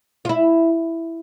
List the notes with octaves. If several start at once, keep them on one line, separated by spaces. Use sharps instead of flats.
F4
E4